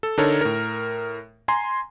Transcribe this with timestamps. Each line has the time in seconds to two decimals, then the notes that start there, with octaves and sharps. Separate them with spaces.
0.03 A4
0.17 D3 D4 D#4 A4 A#4 C#5
0.41 A2 A#4
1.48 G#5 A#5 C6